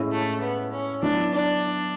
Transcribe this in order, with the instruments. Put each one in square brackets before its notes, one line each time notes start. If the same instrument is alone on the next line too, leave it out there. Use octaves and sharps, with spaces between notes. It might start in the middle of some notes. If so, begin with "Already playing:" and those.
Already playing: [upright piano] A2 G#3 C#4 E4
[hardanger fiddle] A3
B3
C#4
[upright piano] F#3 B3 E4 [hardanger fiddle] D4
[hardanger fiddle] D4